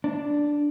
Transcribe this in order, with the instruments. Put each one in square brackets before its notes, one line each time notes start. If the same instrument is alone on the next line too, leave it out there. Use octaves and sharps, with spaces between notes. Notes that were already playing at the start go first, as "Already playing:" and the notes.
[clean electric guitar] D4